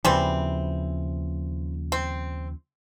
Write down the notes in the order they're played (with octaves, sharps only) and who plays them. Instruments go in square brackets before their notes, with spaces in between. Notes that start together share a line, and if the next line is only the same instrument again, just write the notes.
[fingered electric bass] D#2 C#3 F3 [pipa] E3 G3 C4
[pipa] C4